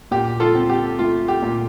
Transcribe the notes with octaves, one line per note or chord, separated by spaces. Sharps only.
A#2 G4
F4 A4
C4
G4
A3 F4
G4
A#2